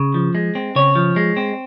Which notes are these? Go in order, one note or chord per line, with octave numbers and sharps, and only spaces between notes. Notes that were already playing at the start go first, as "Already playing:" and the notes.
Already playing: C#3
F3
G#3
C4
C#3 C#5
F3
G#3
C4